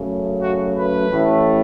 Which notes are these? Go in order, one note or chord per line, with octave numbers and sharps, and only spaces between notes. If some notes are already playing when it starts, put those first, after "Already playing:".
Already playing: F#2 C#3 A3
F#4
B4
A1 A2 A3